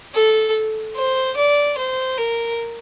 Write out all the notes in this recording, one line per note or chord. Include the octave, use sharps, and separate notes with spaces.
A4
C5
D5
C5
A#4